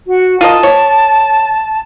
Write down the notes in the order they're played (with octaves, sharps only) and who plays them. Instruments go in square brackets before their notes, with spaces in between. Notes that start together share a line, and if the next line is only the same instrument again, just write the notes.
[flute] F#4
[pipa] F4 A#4 D#5 [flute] A5
[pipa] C#5